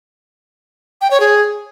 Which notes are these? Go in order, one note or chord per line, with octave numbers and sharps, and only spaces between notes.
G5
C#5
G#4